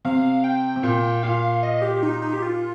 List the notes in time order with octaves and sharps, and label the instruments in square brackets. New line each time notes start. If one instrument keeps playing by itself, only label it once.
[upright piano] C3 [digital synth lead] F5
[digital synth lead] G5
[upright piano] C3
[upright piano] A#2 [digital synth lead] G5
[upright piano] A#2 [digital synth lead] F5
[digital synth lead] D#5
G4
D#4
D#4
G4
F4